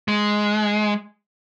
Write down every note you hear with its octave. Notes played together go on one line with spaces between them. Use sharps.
G#3